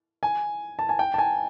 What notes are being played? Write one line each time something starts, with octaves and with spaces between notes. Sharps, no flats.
G#5
A5
G#5
G5
A5
G#5